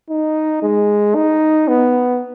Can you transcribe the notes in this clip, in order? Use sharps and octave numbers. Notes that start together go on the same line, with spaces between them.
D#4
G#3
D#4
B3